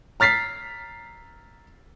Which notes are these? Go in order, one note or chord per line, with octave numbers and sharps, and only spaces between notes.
A#5 F6 A6 B6 C7